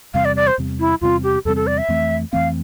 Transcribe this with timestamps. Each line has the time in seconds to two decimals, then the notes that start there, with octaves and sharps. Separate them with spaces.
0.14 E2 C3 G3 C4 F5
0.25 D5
0.36 D5
0.47 C5
0.58 E2 C3 G3 C4
0.80 E4
1.01 E2 C3 G3 C4 F4
1.23 G4
1.45 E2 C3 G3 C4 A4
1.56 A4
1.67 D5
1.78 E5
1.89 F2 E3 A3 C4
2.33 F2 E3 A3 C4 F5